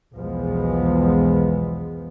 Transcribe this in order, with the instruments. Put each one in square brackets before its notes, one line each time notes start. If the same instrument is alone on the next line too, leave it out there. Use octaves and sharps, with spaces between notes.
[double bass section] B1 E2 F3 G#3 B3